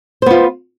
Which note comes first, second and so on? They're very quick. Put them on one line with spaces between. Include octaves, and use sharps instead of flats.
C5 B3 F4